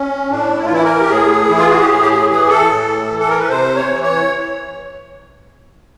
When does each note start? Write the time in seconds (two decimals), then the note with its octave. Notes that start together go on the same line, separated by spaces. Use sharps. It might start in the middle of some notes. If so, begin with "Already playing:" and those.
Already playing: C#4
0.30 A2 D4
0.57 E4
0.65 F4
0.71 E3 E4
0.84 A#4
1.00 G4
1.10 A2 G#4
1.49 E3 E4
1.59 F4
1.70 F#4
1.80 G4
1.89 A2 G#4
2.02 G4
2.10 G#4
2.30 E3 G#4
2.50 A4
2.70 A2
3.10 E3
3.19 A4
3.29 A#4
3.39 B4
3.49 C3 C5
3.76 C#5
3.89 E3
4.03 C#5